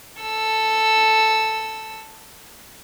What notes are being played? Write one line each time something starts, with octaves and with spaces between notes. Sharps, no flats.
A4 E6